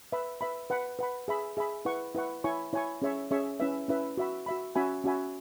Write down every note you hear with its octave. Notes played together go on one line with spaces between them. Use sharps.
B4 E5 B5
B4 E5 B5
B4 F#5 B5
B4 F#5 B5
G#4 E5 B5
G#4 E5 B5
E4 B4 F#5 C#6
E4 B4 F#5 C#6
E4 C#5 G#5 C#6
E4 C#5 G#5 C#6
C#4 G#4 C#5 E5 C#6
C#4 G#4 C#5 E5 C#6
C#4 E4 B4 E5
C#4 E4 B4 E5
F#4 E5 B5
F#4 E5 B5
C#4 F#4 E5 G#5 B5
C#4 F#4 E5 G#5 B5